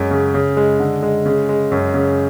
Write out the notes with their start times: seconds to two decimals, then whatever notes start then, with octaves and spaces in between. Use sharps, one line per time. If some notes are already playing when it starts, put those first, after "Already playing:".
Already playing: F#2 G#3
0.11 C#3
0.34 C#3
0.57 G#3
0.80 D3
1.02 G#3
1.25 C#3
1.49 G#3
1.72 F#2
1.94 C#3